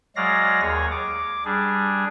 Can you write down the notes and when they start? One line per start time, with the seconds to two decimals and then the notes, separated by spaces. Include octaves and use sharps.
0.16 F#3 G#3 D5 F5 A#6
0.61 D#2 G#4 C#5
0.91 D6
1.45 G3 D4 G#4